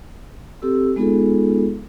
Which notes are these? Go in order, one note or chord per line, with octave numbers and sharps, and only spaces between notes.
C4 G4 A4 E6
G#3 B3 D#4 F4 G#4 A4